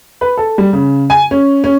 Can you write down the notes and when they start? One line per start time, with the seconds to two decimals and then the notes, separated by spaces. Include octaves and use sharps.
0.21 B4
0.37 A4
0.58 G3
0.73 C#3
1.10 G#5
1.31 C#4
1.64 C#4